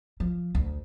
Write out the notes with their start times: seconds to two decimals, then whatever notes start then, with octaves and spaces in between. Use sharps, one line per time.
0.20 F3
0.55 D2